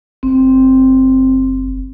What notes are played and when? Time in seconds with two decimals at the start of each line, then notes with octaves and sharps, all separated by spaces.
0.23 F#1 C4